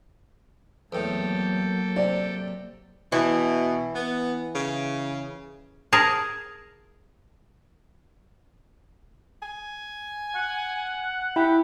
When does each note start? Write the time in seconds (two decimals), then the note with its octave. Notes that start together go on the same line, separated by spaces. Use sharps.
0.92 E2 A2 F#3 A#3 A4 G5
1.96 C3 D5
3.12 B2 E3
3.95 B3
4.55 C#3
5.93 G#4 A#4 A5
9.42 G#5
10.35 F#5
11.36 E4 G4 B5